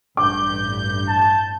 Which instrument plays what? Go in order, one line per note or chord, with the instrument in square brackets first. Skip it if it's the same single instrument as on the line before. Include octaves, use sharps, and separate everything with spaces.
[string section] A1 G2 G6 [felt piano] D6
[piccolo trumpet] A5